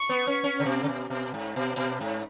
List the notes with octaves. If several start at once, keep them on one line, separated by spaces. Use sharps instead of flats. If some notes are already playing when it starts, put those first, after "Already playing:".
Already playing: C#6
B3
C#4
C#4
C#3
B2
C#3
B2
B2
G#2
B2
B2
G#2